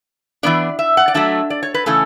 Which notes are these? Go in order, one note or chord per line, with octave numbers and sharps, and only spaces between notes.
E3 B3 D4 D5
E5
F#5
D5
F#3 A3 D4 E5
D5
C#5
B4
C#3 E3 A3 C#4 A4